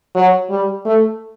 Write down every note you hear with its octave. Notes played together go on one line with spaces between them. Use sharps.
F#3
G3
A3